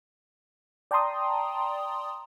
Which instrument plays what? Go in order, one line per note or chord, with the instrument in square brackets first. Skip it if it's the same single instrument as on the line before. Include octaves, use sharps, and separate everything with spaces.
[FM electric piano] D5 G5 A5 A#5 C6 D#6